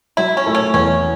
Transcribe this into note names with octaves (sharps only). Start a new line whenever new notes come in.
F#3 E4
C#4
A3 E4 A4
C#4
E2 C#4